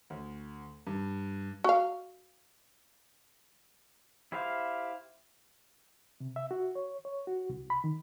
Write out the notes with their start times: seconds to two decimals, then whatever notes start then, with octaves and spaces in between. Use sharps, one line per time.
0.10 D2
0.87 G2
1.64 F#4 F5
4.32 E4 G4 C5 E5 F5
6.20 C3
6.36 E5
6.51 F#4
6.75 C#5
7.05 C#5
7.27 F#4
7.49 C2
7.70 B5
7.84 D#3